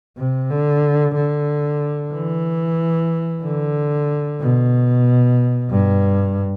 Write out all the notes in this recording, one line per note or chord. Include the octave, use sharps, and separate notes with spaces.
C3
D3
D3
E3
D3
B2
G2